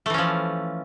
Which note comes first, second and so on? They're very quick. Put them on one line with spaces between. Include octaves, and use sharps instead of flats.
A3 E3 C#4 F3